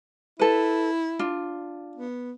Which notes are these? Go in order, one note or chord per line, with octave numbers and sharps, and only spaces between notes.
E4 A4 B4
D4 F4
B3